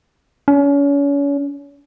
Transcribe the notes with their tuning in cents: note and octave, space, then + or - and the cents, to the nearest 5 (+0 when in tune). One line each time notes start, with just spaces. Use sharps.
C#4 +35